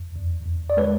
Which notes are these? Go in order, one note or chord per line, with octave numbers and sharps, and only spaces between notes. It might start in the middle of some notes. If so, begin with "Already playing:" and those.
Already playing: F2
E2
E2
D5
G#3 B4 C#5